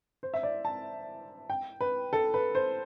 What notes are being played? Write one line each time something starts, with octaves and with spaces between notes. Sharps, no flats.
C5
E5
D5
A5
G5
B4
A4
B4
C5